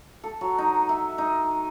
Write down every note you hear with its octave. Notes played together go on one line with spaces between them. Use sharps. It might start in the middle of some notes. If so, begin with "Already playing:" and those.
A4
F#3
D#4
E5
D#4